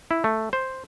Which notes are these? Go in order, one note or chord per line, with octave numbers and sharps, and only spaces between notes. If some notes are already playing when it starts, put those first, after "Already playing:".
E4
A3
C5